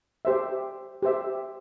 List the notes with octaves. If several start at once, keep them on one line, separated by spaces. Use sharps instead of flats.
G4 C5 E5
G4 C5 E5